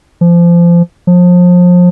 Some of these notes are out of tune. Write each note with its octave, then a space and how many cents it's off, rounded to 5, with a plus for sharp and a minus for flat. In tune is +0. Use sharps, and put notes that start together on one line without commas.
F3 -25
F3 +30